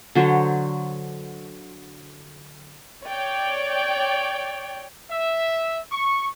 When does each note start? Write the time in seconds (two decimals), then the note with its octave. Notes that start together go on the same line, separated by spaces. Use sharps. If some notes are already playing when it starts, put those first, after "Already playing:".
0.15 D3 F#3 C5 C#5
3.07 C#5 D5 G5
5.11 E5
5.91 C#6